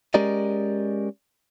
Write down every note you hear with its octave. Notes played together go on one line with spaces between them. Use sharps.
G#3 C#4 G4 A#4 D5 D#5